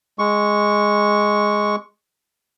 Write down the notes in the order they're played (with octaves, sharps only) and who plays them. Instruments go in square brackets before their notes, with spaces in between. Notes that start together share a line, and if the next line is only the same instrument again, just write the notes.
[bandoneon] G#3 C#6